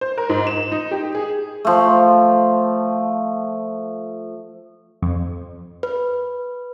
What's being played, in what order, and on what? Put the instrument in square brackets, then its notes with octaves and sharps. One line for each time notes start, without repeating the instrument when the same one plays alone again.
[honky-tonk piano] C5
A#4
G#2
E7
D#4
G4
G#4
[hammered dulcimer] F3 A3
[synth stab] F2
[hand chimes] B4